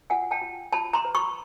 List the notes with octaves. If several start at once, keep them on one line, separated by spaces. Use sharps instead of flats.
F4 F#5 G#5
G5 A5
F4
F4 A5 B5
A#5 C6
B4
B5 C#6